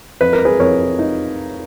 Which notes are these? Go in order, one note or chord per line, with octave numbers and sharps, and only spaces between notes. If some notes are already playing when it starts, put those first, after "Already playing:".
F2 B4
A#4
G#4 B4
F2 A#4 C#5
D#4